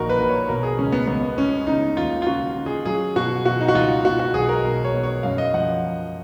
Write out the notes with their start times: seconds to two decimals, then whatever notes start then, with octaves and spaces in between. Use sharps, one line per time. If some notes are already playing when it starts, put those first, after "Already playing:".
Already playing: A#1 A#2 F3 D#4 F#4 A#4
0.09 B4
0.18 A#1
0.29 C#5
0.49 B2 A#4
0.63 G#4
0.79 C#2 C#4
0.92 B3
1.07 C#2 B3
1.38 G#3 C#4
1.67 C#3 D#4
1.96 D#2 F4
2.22 F4
2.26 C#3 F#4
2.57 C#3
2.66 G#4
2.85 F#3 G#4
3.16 B2 F#4
3.45 B2 F#4
3.61 D#4
3.68 F#4
3.75 C#2 F4
4.05 B2 F#4
4.19 F#4
4.34 B1 G#4
4.49 A#4
4.64 B2
4.84 C#5
4.93 B2
5.03 C#5
5.23 F#2 F5
5.38 D#5
5.54 F3 F#5